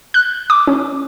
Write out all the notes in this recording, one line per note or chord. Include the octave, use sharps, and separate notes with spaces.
F#6
D6
C#4